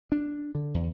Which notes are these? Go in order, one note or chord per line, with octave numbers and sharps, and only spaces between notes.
D4
D3
E2